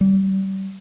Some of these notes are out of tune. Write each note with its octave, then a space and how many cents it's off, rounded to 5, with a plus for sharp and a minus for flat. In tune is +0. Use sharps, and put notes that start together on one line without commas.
G3 -30